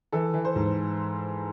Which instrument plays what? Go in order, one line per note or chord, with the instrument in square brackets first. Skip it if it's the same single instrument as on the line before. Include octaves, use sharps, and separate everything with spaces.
[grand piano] E3 A4
E3
C5
G#2